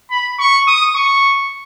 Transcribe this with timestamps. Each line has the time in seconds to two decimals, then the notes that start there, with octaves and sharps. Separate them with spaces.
0.11 B5
0.39 C#6
0.68 D#6
0.96 C#6